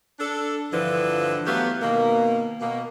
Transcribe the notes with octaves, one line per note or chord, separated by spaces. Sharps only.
D4 A4
G2 D3 E3 F3
F#3 A3 B3 G4 F5
B2 D#3 A#3
B2 A#3